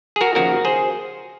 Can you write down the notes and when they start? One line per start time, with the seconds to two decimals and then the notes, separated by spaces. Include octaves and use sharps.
0.16 G#4
0.21 F#4 A#4
0.35 D#2 C#3 F3 F#4 A#4
0.65 G#4 C5